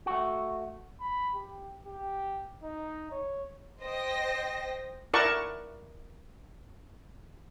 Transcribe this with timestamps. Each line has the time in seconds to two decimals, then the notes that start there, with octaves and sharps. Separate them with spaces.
0.06 A3 F#4
1.01 B5
1.35 G4
1.86 G4
2.63 D#4
3.11 C#5
3.82 C5 D#5 G5 A#6
5.14 E4 A#4 D5 F#5 A5 C#6